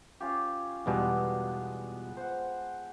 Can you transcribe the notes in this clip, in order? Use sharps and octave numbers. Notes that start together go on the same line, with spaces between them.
C#4 F4 G4
E2 B2 G3 G#3 B3 D4
C5 F#5